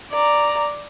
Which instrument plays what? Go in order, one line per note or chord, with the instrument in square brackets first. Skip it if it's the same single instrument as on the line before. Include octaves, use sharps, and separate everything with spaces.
[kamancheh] D5 A#5